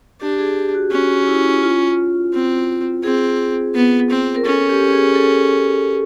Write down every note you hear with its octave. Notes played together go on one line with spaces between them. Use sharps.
D4 G4
G#4
G4
F#4
C#4 F#4
E4
F4
C4
C4 G#4
B3
C4
A#4
C#4 A4
G4
G#4
A4